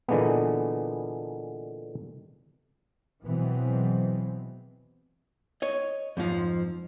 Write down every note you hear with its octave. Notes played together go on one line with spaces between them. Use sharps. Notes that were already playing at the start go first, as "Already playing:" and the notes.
A#2 D3 E3 G#3 A#3 B3
B2 E3 F#3 G#3 B3 C4
C#5 D#5
F2 G#2 F3